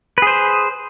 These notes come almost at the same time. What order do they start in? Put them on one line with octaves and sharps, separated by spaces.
B4 G#4 C5